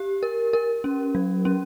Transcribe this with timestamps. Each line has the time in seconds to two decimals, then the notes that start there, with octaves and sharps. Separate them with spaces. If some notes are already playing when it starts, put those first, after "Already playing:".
Already playing: G4
0.23 A#4
0.53 A#4
0.84 C#4
1.15 F#3
1.45 C#4